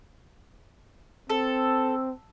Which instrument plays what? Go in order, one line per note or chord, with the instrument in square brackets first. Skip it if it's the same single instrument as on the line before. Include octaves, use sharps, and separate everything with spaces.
[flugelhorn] C4 [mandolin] A4